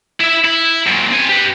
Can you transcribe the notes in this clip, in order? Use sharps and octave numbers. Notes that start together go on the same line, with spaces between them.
E4 E5
E4
F#2 A#2
C4 G#5
G4 B4